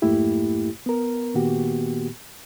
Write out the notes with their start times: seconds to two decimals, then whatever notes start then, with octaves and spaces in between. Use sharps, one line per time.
0.02 F2 G#2 A3 A#3 E4 G4
0.86 B3 A#4
1.34 A#2 D#3 A#3 B3 F#4 G4